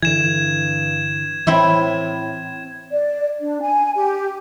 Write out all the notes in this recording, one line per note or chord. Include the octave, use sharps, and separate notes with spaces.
G2 D3 E3 G#6 E7
A2 E3 C4 E4 E5
D5
D4
G#5
G4